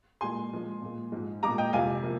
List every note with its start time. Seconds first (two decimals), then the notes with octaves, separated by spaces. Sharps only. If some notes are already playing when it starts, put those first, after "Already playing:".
0.21 A#2 G#3 G#5 C6
0.51 A#2 F3 G#3
0.82 A#2 G#3
1.12 G#2 F3 G#3
1.43 A#2 G#3 A#5 D6
1.58 D#5 G5
1.73 F2 C3 F3 G#3 F5 G#5
2.03 C3 F3 A#3